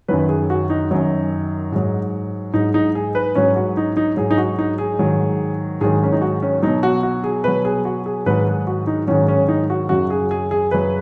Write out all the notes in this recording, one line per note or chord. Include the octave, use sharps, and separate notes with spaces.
F#2 D#3 F#3 B4
G#4
F#4
D#4
F#2 D#3 F#3
G#2 F#3
G#2 F#3 D#4
D#4
G#4
B4
G#2 F#3 C#4
F#4
D#4
D#4
G#2 F#3 G#4
D#4
F#4
D#4
G#4
G#2 D#3 F#3
G#2 D#3 F#3 G#4
C#4
D#4
F#4
C#4
B2 F#3 D#4
F#4
F#4
G#4
B2 F#3 B4
G#4
F#4
G#4
G#2 D#3 F#3 B4
G#4
F#4
D#4
G#2 D#3 F#3 C#4
C#4
D#4
F#4
F#2 C#3 F#3 F#4
G#4
G#4
G#4
F#2 C#3 F#3 B4